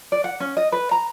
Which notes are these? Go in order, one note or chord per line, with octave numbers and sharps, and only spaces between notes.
D5
F#5
C#4
D#5
B4
A#5